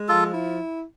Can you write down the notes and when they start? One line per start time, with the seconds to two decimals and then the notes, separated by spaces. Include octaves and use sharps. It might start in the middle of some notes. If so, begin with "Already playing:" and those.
Already playing: G#3
0.08 F3 F4 A4
0.34 E4